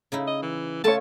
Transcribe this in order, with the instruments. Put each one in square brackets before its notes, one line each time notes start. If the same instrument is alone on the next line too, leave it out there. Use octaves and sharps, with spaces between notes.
[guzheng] C#3 D#4 E4
[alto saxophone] D#5
E3
[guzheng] A3 F4 [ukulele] A4 C#5 [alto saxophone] A5